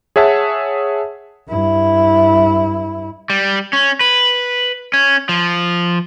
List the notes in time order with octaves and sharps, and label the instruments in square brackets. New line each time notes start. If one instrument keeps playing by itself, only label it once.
[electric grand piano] G#4 C#5 E5 F#5 A5
[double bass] G2 E4
[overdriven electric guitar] G3
C#4
B4
C#4
F3